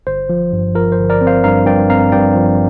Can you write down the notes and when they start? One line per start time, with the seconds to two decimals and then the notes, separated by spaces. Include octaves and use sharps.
0.07 G1 C5
0.29 F3
0.52 G2
0.75 F3 A#4
0.92 C5
0.98 G1
1.10 A#4 D5
1.21 C4
1.27 C5 F5
1.44 G2 F5 A#5
1.66 G2 D5 G5
1.90 C4 F5 A#5
2.12 G2 D5 G5
2.35 F3